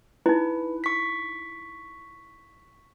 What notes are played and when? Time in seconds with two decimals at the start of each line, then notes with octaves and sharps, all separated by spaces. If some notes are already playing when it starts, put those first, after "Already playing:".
0.26 D#4 E4 B4
0.84 C#6 B6